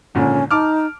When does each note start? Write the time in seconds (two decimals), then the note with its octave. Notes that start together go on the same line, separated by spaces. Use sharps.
0.15 G#1 A#2 D3 C#4
0.51 D#4 A5 D6 F6